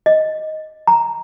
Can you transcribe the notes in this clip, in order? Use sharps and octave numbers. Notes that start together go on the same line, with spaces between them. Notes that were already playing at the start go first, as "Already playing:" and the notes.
D#5
A#5